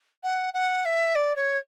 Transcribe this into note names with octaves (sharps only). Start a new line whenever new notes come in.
F#5
F#5
E5
D5
C#5